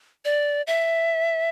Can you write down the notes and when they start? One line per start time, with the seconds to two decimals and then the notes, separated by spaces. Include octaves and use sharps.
0.25 D5
0.67 E5